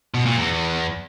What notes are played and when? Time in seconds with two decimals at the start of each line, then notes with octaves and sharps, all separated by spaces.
0.14 B2
0.25 A#2
0.37 E2